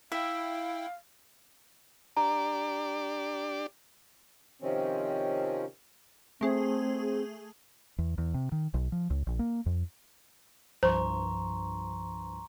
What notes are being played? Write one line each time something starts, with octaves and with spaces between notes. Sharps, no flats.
E4 E5 F5 G5
D4 G4 D5 A#5
C3 D#3 F3 C4 C#4
A3 C4 G#4
E2
E2
C3
D#3
B1
F3
C#2
A#1
A#3
F2
C2 G2 F3 C5 A#5 C6 C#6